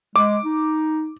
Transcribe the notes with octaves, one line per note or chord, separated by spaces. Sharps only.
G#3 D6
D#4